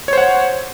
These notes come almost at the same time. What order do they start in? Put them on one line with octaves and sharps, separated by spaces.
C#5 C5 F#5